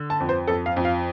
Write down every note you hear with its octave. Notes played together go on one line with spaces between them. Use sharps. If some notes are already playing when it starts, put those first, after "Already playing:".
Already playing: D3
A5
F2
C5
F2 A4
F5
F2
F5